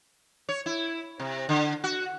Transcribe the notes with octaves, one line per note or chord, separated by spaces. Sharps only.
C#5
E4
C3
D3
F#4